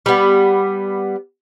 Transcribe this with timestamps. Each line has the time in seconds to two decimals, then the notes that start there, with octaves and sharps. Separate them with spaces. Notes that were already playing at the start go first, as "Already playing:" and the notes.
0.06 G3 B3